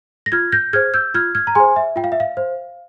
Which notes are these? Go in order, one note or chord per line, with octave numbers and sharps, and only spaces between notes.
A#6
F4 F6 G#6
G6 A#6
G#4 C5 F6 G#6
E6 G6
F4 F6 G#6
F6 G#6
A#5
G#4 C5 G#5 C6
E5
F4 G5
F5
E5
F5
C5